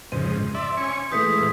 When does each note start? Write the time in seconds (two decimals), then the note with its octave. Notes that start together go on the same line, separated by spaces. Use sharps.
0.12 F2 G#2 C#3 C5 D#7
0.55 D5 E5 C6
0.77 C#4 G#5 C#6
1.12 E3 G#3 A3 B4 D#6 G6 B6
1.36 D#1 E6 G#6